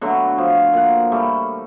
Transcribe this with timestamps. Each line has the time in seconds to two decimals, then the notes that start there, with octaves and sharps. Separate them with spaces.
0.01 B2 D3 F#3 A3
0.38 F3
0.73 A#2 F#5
1.12 G3 A3